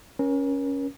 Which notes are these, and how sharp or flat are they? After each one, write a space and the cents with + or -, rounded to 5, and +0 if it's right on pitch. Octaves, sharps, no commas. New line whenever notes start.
C#4 +0 A#4 +35